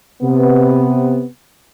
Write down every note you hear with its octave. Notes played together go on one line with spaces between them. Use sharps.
C3 B3